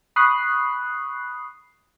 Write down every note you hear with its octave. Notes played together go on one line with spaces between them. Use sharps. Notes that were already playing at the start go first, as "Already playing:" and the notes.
B5 C#6 D#6 F#6 C7